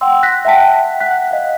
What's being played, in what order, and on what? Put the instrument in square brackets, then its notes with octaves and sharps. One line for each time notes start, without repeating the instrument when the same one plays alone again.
[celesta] F#5 G5 C6 E6
F#6 A#6 B6
E5 F#5 G5 A5 B6
F#5 F#6 B6
D#5 F5